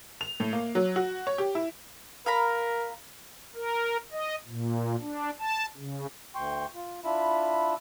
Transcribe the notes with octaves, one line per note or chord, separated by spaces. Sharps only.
F7
A2
A#3
F#3
F#4
C#5
G4
E4
A#4 F5 A#5 B5
A#4
D#5
A#2
D4
A5
C#3
D2 G5 C6 C#6
F4
D4 E4 F4 E5 B5